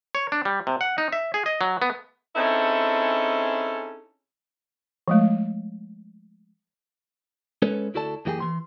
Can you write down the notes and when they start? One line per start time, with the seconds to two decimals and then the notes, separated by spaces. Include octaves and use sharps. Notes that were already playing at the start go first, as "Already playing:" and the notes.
0.15 C#5
0.32 D4
0.45 G3
0.67 C3
0.81 F#5
0.98 D#4
1.12 E5
1.34 G#4
1.46 D#5
1.61 F#3
1.82 B3
2.35 C4 C#4 D#4 E4 G#4 A4
5.08 F3 G#3 A3
7.62 G#3 C#4 A4 B4 C#5
7.94 D2 E4 F#4 A4 D5 A5
8.25 F#2 E3 A#3 F4 G4 G#4
8.40 E3 C6